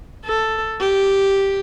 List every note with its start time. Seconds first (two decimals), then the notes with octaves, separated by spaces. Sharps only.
0.25 A4
0.80 G4